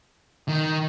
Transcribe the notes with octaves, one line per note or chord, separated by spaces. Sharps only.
D#3